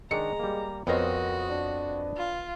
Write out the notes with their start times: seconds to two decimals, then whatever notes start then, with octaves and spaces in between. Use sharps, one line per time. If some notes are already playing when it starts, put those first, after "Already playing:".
0.11 D#3 G#3 D4 A#5 C#7
0.39 G3 A#3
0.87 F2 B3 C4 F#4 A#4 C#5 D#5 F5
1.50 D4
2.17 F4